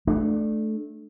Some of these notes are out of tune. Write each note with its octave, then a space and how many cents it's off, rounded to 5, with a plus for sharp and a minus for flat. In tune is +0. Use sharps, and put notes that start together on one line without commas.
A3 -15 D4 +15